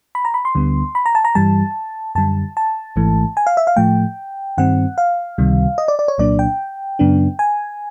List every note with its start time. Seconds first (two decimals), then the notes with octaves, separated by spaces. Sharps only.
0.15 B5
0.25 A#5
0.34 B5
0.45 C6
0.55 D2 D3 G3 B3
0.95 B5
1.06 A#5
1.15 A5
1.25 A#5
1.35 G2 E3 G3 A5
2.15 F#2 D3 G3 A5
2.57 A5
2.96 G#1 G#2 E3 A3
3.37 G#5
3.47 F5
3.57 E5
3.67 F5
3.76 A2 F3 A3 G5
4.58 G2 D#3 G3 C4 F#5
4.98 F5
5.38 C#2 C3 D#3 G3
5.78 D#5
5.88 D5
5.99 D5
6.08 C#5
6.18 C2 A#2 F#3 A#3 D4 D5
6.39 G5
6.99 F#2 C#3 F#3 B3 D4
7.39 G#5